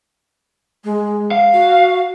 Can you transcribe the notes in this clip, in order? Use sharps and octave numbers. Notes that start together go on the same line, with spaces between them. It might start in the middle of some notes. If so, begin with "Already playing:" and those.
G#3
F5
F#4